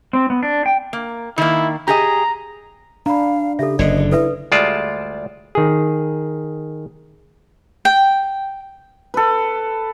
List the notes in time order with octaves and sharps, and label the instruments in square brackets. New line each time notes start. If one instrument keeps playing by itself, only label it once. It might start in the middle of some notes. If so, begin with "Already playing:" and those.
[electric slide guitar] C4
B3
D4
G5
[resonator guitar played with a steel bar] A#3
[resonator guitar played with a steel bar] D#3 A#3 [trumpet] E4
[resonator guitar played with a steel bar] G4 G#4 D#5 [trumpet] A#5
[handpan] D4 [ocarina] F5 [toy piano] A#5 B5
[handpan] C#3 [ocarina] G4 [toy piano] A4 E5
[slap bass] F#1 D3 [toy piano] D5 [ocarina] D#5
[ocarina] E4 [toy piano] A4 B4 E5
[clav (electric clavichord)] D2 G3 G#3 F4 D5 A5
D#3 G#4
[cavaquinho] G5
[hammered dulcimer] A4 B4